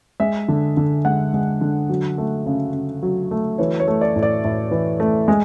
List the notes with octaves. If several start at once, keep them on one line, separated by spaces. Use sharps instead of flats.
G#3 E5
D3
D3
G#3 F#5
G#3
D3
F#3
A3
C#3
C#3
F#3
A3
E3 C#5
C#5
A3
D5
A2
D5
A2
E3
A3
G#3